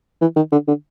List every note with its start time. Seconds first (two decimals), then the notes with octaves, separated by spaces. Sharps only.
0.22 E3
0.36 D#3
0.52 D3
0.68 D3